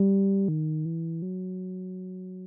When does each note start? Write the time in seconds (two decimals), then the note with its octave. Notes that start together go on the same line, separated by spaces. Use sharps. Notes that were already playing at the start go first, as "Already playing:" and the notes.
Already playing: G3
0.48 D#3
0.85 E3
1.22 F#3